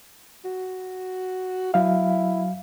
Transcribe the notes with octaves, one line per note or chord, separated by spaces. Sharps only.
F#4
F#3 E4 F5